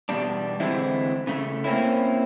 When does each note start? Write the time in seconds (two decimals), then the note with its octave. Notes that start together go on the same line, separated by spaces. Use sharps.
0.09 E2 B2 G3 D4
0.60 D3 E3 G#3 C4 E4
1.27 C#3 A3
1.64 A#3 C4 C#4 E4